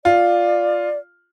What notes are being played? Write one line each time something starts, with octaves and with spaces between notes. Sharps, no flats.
F4 D5